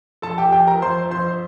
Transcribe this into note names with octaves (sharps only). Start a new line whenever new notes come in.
F2 A4 A5
G4 G5
F2 G4 G5
A#4 A#5
F2 C5 C6
F2 C5 C6